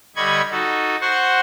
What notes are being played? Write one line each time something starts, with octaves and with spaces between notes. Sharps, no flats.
D3 G3 D#5 B5 C#6 G#6
D#4 F#4 A4
F#4 C5 F#5 C6 C#6